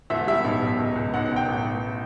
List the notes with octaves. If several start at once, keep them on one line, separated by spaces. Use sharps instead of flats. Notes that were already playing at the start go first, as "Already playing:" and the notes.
E1 E5
G3 E5
B1
B1
C#2
C#2
B1 F#5
F#5
B1
G5
A1
A1